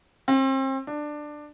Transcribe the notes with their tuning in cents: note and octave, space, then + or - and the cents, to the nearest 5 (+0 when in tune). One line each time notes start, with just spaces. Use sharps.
C4 +35
D4 +15